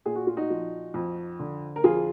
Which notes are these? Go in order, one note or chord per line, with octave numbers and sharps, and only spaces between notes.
A#2 G#4
F#4
F4
D#4 F#4
F3
F2
D3
A#4
F2 F4 G#4